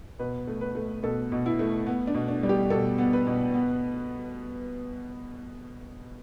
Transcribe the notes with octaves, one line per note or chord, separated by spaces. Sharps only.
B2 B4
A3
B4
A3
B2 A4
B2
E4
A3
B3
D4
B2
D4
G3
G4
B2 A4
B3
B4
B2
B3